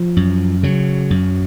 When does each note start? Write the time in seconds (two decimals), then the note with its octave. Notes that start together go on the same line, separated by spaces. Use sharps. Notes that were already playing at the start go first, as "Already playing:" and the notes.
Already playing: F3
0.17 F#2
0.63 C#3 F#3
1.10 F#2